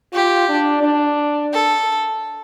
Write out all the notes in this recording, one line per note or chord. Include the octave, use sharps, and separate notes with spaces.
F4 G4
D4
D4
A4